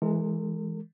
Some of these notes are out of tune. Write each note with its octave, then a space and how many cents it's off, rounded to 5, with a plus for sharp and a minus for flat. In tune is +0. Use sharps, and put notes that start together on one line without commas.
E3 +0 G#3 +10 A#4 -40